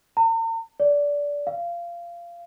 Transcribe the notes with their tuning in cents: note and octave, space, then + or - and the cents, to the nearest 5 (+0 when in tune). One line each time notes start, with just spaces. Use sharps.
A#5 -45
D5 -20
F5 -20